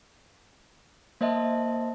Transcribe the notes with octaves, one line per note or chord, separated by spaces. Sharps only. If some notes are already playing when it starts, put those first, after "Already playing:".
A#3 C5 D#5 E5 A5